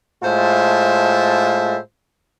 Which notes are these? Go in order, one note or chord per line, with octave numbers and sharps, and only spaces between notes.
A2 G#3 F4 C5 E5 A5